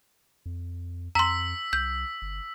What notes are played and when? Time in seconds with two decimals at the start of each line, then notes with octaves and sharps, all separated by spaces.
0.46 F2
1.15 F2 A#5 C6 E6 B6
1.73 C2 G6
2.22 G1